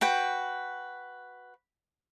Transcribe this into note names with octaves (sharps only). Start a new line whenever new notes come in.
F#4 B4 G5